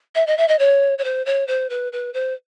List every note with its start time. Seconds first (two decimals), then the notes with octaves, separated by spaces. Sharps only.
0.15 E5
0.27 D#5
0.37 E5
0.48 D#5
0.59 C#5
0.98 C#5
1.04 C5
1.26 C#5
1.48 C5
1.70 B4
1.93 B4
2.14 C5